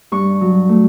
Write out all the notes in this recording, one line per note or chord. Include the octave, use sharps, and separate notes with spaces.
G2 C#6
F#3
A3